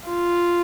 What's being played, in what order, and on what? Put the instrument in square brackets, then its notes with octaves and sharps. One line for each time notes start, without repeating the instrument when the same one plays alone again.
[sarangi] F4